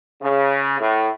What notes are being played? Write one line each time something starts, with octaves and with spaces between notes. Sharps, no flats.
C#3
A2